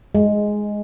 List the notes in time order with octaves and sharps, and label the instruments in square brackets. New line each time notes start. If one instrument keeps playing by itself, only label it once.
[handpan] G#3